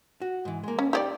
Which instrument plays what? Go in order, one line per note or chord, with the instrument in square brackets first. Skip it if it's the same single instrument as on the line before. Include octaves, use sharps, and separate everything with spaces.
[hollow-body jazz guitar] F#4
G#2 E3
G#3 A#3
[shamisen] C#4
[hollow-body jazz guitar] D#4 G5 [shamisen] G4 G#4 D5